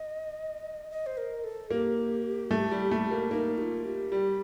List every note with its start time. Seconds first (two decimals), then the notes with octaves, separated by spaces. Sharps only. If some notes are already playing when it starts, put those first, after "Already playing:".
Already playing: D#5
0.91 D#5
1.06 C5
1.17 A#4
1.44 A4
1.71 A#3 G4
2.51 A3
2.71 G3
2.91 A3
3.11 A#3
3.31 A#3 D#4
3.58 G4
3.62 F4
3.85 G4
4.12 G3